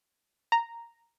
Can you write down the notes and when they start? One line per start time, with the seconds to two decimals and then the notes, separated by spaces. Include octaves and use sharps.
0.52 A#5